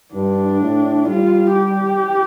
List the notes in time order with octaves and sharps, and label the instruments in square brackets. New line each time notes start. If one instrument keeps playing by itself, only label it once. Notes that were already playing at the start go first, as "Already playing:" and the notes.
[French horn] G2 [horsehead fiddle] D4
[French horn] A2
[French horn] G3 [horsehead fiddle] F4
[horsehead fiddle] G4